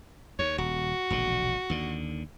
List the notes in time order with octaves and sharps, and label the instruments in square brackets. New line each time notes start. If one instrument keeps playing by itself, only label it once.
[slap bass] D#2 [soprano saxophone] C#5
[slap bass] D#1 [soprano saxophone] F#4
[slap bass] E1 A#1 D3
D#2 D3